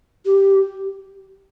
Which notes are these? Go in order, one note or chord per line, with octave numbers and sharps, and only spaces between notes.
G4